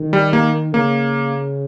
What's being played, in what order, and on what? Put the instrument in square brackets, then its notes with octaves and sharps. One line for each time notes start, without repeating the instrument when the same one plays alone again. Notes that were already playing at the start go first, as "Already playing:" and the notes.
Already playing: [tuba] D#3
[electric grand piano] G3
A#3
[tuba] C#3 [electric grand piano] A#3